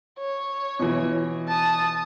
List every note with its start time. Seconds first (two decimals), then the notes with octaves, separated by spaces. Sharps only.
0.19 C#5
0.80 B2 E3
1.48 A5 D#6